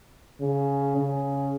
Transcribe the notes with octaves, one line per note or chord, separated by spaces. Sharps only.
C#3
C#3